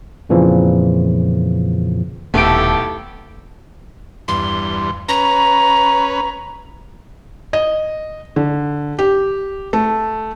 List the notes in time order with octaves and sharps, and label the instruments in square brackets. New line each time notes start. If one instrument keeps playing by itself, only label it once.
[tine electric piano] F2 A#2 C#3 E3 F3
[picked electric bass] D#1 [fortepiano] B1 [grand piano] A3 D7 [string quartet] E4 G4 A4
[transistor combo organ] E2 G2 [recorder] C6
[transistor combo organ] C#4 B4 [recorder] A#5
[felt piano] D#5
D3
G4
A3